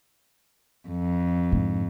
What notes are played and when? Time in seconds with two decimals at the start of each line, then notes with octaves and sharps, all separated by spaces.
0.88 F2
1.52 G#2 D3